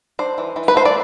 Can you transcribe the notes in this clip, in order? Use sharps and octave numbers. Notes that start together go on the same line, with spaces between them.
D4 C5
E3
E3
B4
A3 C5
D5